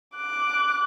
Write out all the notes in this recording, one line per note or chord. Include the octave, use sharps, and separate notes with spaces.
D6 F#6